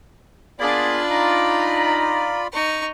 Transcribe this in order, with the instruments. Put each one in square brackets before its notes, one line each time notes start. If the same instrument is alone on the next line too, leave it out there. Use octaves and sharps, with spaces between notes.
[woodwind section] A#3 B3 G#4 [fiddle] D4 [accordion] F4 D5 B5
[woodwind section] D#4 A#5
[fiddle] D#4 C#6